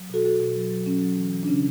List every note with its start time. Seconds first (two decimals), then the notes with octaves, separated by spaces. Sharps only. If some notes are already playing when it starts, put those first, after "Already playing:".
Already playing: F#3
0.10 B2 F#4 A4
0.24 B2 F#4 A4
0.40 B2
0.56 F#3
0.70 F#3
0.86 F#3 C#4
1.02 F#3
1.17 E3
1.33 E3
1.43 D4
1.48 C#3 C#4